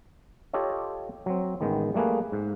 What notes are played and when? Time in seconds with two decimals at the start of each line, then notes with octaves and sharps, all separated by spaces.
0.53 F4 G4 A4 C#5 D#5
1.26 F#3 C4
1.61 A1 D#3 G#3 B3 G5
1.94 G3 A3 A#3 G#4 B4
2.32 G#2